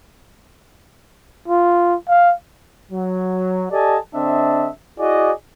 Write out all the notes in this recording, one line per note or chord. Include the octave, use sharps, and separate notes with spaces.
F4
F5
F#3
G4 A4 D5 D#5 G#5 A5
D3 C4 D4 D#5 E5
E4 F#4 G#4 D5 D#5